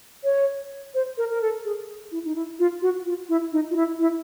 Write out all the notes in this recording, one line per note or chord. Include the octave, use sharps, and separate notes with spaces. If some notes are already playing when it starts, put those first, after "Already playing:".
C#5
C5
A#4
A#4
A4
G#4
E4
D#4
E4
F4
F#4
F4
E4
D#4
F4
E4
E4